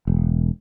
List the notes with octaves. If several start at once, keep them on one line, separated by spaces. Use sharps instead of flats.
E1